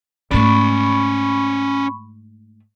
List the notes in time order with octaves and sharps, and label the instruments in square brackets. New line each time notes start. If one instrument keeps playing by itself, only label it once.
[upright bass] G#2 A3 [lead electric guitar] C#4 D5 [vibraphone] B5 C#6